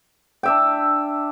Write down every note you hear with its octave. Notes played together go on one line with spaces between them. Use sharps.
D4 E5 G5